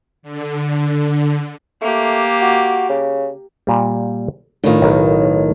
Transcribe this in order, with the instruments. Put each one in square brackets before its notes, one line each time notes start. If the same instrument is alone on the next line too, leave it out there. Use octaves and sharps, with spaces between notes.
[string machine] D3
[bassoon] A3 [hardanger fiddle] A#3 G4
[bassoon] F#4
C#3
[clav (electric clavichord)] A#2 G3
[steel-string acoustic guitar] A2 D#3 [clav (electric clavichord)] D4 F4
[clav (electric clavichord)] B1 A#4 B4